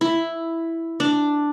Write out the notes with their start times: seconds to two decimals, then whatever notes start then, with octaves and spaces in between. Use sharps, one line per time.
0.01 E4
1.00 D4